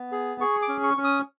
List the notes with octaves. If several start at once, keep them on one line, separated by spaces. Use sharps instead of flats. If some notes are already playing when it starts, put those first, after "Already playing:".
Already playing: B3
G#4
G#4 C#6
D6
C#4
C#6
C#4
D#6